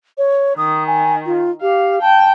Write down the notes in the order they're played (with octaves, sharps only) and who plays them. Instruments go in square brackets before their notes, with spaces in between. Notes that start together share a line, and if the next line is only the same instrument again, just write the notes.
[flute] C#5
[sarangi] D#3 [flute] D#6
[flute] G#5
F4
[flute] G4 [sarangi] F5
[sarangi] G5 [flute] A5